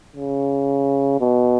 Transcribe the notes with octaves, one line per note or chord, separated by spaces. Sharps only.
C#3
B2